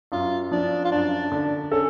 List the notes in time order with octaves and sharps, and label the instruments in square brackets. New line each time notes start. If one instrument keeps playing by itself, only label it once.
[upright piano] F#2 [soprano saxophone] F4
[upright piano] F3 [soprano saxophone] D4
[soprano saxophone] F4
[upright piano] F#2 [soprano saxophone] D4
[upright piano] D3
[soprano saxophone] C#4 [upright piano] A4